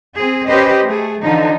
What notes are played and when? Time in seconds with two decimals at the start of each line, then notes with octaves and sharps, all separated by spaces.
0.15 C4 G#4
0.47 C#4 G4 B4 C5 D#5
0.84 A3 G#4
1.22 D3 E3 F3 D#4